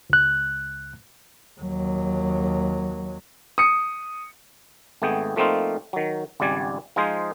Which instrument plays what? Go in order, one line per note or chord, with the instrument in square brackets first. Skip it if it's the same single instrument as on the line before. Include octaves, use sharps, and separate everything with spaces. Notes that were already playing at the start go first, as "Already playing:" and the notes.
[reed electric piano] C#2 F#6
[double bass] D#2 F#3
[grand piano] D#6 C#7
[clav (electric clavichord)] G#1 A3 B3 G#4 G5
F3 A3 A#3 C4 D#4 F4
D#3 F#3
G#1 C#2 G3 D5 G#5
F3 G#3 D#4 F4 G#4 C5